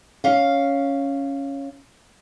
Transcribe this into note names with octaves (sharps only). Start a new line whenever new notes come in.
C#4 F5